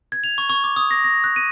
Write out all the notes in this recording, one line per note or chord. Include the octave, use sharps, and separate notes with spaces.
G#6
F7
C#6
C#6
D6
D#6
A#6
A#6
F#6
D#7